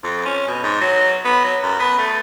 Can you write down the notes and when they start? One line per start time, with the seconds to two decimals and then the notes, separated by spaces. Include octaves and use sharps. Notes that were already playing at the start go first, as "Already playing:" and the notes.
0.04 F2
0.25 C#4
0.47 B2
0.63 G#2
0.81 F#3
1.25 B3
1.44 F#3
1.62 F#2
1.79 B3
1.98 A3